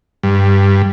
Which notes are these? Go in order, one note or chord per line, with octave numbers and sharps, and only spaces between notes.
G2